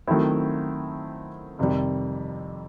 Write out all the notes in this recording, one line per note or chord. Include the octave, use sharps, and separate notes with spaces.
D#3 F#3 A3 C4 E4
F2 C3 D#3 G3